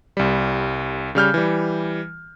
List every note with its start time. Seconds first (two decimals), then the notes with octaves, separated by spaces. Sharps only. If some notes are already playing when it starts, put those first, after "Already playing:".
0.17 C2 G3
1.15 C#3 G3 F6 G6
1.34 E3 G3